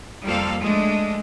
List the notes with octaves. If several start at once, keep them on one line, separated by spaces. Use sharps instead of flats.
F2 F3 G3 A#3 A4 F5
G#3 A3 D4